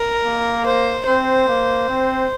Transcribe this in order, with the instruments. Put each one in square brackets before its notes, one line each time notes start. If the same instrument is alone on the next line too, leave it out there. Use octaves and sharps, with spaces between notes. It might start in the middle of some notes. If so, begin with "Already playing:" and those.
Already playing: [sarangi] A#4
[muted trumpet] A#3
[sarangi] C5
[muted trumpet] C4 [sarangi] C5
[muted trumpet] A#3
C4